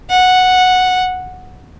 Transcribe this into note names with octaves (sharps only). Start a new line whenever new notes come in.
F#5